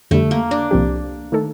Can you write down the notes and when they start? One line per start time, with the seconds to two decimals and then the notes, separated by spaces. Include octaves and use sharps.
0.11 F2 D3 G3 A3
0.31 A#3
0.51 D4
0.71 C2 A#2 F3 C4 G4
1.32 D#3 A3 D#4 A4